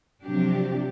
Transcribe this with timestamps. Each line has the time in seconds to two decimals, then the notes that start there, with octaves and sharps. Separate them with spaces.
0.22 C3 F3 F#3 D4 G4